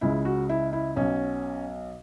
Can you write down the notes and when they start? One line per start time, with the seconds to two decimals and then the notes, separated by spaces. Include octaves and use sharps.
0.01 C#2 C#3 G#3 E4
0.25 F#4
0.49 E4
0.73 E4
0.96 B1 B2 F#3 C#4